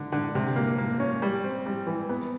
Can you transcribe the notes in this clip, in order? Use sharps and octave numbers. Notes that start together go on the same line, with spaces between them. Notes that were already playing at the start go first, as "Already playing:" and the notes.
Already playing: D3
D3
C3
A#3
A#3
C#4
G3
C4
G3
E3
B3